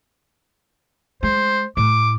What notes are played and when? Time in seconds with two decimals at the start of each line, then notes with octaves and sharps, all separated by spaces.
1.23 G#3 C5
1.77 A2 D6